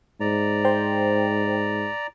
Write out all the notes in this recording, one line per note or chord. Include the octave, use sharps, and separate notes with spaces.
G#2 D5 A#5
C5 G5